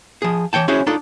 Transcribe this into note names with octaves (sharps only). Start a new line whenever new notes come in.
F3 G#4
E3 C#5 G5 A5
C#4 E4 F#4 G#4 C5 C#5
D4 D#4 F4 A4 D5